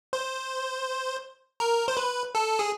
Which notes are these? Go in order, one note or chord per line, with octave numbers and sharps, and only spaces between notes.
C5
A#4
C5
B4
A4
G#4